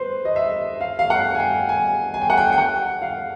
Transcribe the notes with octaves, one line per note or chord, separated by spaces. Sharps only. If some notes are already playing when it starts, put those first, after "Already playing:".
Already playing: B4 C5
D#5
E5
F5
F5
F#5
G#5
G5
G#5
G#5
G5
F#5
G5
G5
F#5
F5